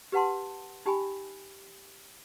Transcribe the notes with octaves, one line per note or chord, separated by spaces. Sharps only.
G4 B4 F#5 A5 C6
D#4 G4 G5 G#5 B5